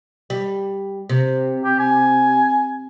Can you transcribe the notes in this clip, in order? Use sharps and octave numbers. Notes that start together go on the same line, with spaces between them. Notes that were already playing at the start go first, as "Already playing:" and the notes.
G3
C3
G4
G#5